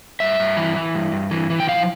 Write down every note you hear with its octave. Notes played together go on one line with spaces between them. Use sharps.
G2 E5
G2
E3
E3
G2
G2
E3
E3
G5
F3 F5